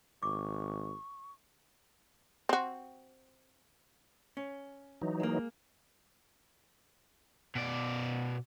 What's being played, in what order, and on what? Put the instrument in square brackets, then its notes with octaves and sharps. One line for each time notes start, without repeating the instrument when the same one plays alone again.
[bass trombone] G#1 [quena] C#6 [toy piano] D6
[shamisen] C4 F#4
[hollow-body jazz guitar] C#4
[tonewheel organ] E3 F#3 D#4
[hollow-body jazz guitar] G#3 A#3
[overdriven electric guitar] B2 D5